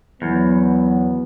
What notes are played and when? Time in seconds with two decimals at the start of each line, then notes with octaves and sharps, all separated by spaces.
0.22 E2 F#3 B3